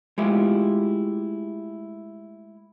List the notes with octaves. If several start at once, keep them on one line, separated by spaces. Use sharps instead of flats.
G#3 A3 E4 F4 G4